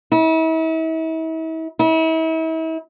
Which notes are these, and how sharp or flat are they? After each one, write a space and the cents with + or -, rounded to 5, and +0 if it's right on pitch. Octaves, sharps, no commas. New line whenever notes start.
E4 -40
E4 -40